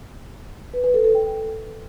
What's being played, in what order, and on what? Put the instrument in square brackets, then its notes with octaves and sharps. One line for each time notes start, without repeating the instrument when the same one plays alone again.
[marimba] B4
B4
A4
A4
G5